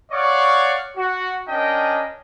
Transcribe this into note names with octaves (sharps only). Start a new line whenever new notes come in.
C#5 D5 F5 F#5 C#6
F#4
C#4 D4 A#4 D#5 G5 A5